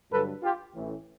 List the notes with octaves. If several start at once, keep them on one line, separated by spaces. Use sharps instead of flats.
G2 D3 F#3 A4 B4
F4 G4
A1 A2 E3